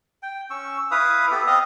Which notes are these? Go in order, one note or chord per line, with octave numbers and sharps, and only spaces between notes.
G5
C#4 C#6 E6
E4 B4 F5 D#6
B3 G4 A4
C4 D#5 F5 D#6